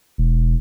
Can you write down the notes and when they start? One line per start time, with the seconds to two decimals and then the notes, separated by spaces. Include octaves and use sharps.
0.18 E1